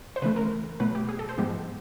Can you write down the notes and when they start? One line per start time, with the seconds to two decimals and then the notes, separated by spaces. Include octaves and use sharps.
0.16 C5
0.22 C#3 E3 A3 B4
0.36 A#4
0.80 B2 F#3 A3 B4
0.95 G4
1.09 G#4
1.19 A4
1.29 C5
1.38 G#2 F3 G#3 B3 G4